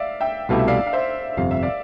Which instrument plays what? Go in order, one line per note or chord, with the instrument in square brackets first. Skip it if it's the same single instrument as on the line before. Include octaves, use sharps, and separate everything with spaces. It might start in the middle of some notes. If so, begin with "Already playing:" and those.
Already playing: [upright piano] D5 E5 F5
E5 G5
[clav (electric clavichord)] C2 B2 A3 E4 G4 [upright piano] F5
[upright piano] E5
D5 F5
F5
C5 E5
[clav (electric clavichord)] G1 F2 C3 [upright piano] F5
[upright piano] E5
D5 F5